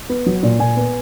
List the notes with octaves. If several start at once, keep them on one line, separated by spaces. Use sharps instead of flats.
B3
F#3
A#2
A#2 G#5
B3